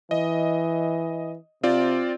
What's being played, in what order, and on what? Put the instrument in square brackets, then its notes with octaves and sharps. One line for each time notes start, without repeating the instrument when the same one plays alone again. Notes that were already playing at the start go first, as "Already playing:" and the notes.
[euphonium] E3 [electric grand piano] D#5
[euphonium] C3 [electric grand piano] C4 F4 D5